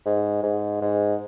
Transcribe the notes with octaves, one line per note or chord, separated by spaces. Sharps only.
G#2
G#2
G#2